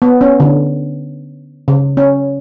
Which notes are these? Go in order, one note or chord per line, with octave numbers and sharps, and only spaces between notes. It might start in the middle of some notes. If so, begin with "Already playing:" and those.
B3
C#4
D3
C#3
C#4